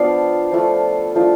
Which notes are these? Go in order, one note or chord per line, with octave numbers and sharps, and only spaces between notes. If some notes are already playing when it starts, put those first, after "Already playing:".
Already playing: F3 B3 D4 F4 D5 F5
F3 A3 D4 F4
F3 A3 D4 F4